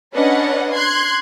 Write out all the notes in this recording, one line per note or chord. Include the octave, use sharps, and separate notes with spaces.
C#4 D4 B4 C#5 D#5 F#5
C6 F#6 G#6